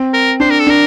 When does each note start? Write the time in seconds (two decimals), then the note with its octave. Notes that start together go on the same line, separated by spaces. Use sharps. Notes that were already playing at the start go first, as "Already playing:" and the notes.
Already playing: C4
0.13 A#4
0.40 D4 C5
0.50 A#4
0.60 A4
0.67 D4 A#4